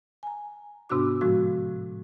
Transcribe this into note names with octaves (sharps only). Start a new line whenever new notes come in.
G#5 A#5
G#2 C3 B3 D4 F#4 D6
A2 F3 G#3 F#4